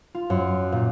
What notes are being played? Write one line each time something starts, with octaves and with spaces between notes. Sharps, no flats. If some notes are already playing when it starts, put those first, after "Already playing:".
F4
F#2
A#2